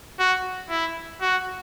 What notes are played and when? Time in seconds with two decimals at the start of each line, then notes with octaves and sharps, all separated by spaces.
0.19 F#4
0.70 E4
1.21 F#4